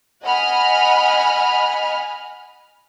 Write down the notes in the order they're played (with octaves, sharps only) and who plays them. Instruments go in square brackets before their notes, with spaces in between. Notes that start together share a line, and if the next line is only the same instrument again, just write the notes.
[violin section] D#5 F#5 G#5 B5 F6